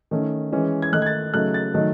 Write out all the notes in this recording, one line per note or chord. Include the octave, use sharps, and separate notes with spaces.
D#3 A3 C#4
E3 G#3 C#4
G#6
D#3 A3 D#4 F#6
G#6
A6
C#3 F#3 A3 D#4 F#6
A6
D#3 F#3 A3 D#4